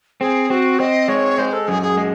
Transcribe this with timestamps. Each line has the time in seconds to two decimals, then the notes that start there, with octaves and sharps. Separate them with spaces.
0.21 C4 G#4
0.50 C4 F#4
0.80 C4 D#5
1.08 G#3 C#5
1.38 G#3 C5
1.53 A4
1.68 F#2 G#4
1.82 G#4
1.97 G#3 G#4